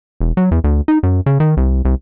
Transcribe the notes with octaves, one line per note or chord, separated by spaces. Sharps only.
E1
F#3
E2
D2
D#4
F#2
C#3
D#3
C2
C2